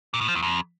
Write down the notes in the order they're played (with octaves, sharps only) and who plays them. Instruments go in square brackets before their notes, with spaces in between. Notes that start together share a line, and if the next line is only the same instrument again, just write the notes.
[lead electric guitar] A#2
A2
F3
E2
F2